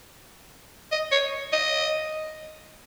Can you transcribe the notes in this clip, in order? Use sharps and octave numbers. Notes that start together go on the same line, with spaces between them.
D#5
C#5
D#5